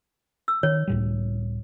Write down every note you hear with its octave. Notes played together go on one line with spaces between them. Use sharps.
E6
D#3 C#5
C#2 A2 G3